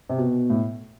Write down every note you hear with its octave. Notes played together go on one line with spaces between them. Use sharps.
C3
B2
A2